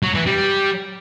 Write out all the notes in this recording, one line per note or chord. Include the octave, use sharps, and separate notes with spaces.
F#3
E3
G3